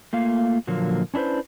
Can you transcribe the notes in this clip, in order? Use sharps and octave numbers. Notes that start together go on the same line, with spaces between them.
A3 A#3 F4 F5
A#2 D3 F3 F#3 A#3
C#4 D4 E4 B4 C5